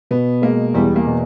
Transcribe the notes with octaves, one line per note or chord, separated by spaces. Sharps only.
B2 B3
G#3 A#3
E2 G3
A#3
B2